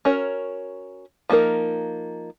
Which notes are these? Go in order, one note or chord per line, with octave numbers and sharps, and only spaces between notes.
C#4 F#4 A#4 C#5
F3 A#3 D#4 A#4